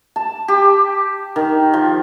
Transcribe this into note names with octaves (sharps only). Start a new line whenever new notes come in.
A5
G4
D#3
F3